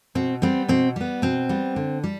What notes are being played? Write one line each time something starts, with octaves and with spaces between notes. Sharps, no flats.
B2 C4
G3 B3 C4
B2 C4
G3 B3
B2 C4
G3 B3
D3
G3